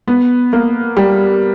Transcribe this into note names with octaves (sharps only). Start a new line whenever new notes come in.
B3
A#3
G3